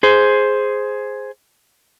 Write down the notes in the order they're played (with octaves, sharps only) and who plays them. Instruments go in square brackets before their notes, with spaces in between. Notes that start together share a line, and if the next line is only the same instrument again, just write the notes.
[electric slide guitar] G#4 C5